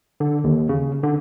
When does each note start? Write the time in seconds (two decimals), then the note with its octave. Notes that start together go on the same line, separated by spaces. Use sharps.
0.20 D3
0.44 D#2
0.69 C#3
1.03 D3